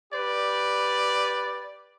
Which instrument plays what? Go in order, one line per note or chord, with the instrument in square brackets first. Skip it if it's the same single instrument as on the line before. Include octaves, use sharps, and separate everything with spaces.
[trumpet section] G4 B4 D5